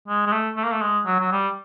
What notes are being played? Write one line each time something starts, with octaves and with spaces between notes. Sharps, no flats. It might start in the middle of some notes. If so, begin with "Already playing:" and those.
G#3
G#3
A3
A3
A#3
A3
G#3
F#3
F#3
G3